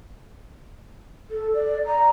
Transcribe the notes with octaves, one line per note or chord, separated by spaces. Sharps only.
A4
D5
A#5